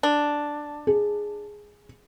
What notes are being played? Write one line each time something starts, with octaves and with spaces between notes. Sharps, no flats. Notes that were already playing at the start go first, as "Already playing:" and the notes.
D4
G#4